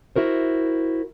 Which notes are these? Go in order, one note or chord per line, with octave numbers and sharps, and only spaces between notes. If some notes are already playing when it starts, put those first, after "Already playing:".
E4 F#4 A#4 C5